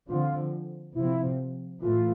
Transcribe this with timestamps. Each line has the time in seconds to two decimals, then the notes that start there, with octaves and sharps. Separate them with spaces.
0.09 D3 F3 C4 F4
0.95 C3 F3 C4 E4
1.82 A2 E3 A3 F4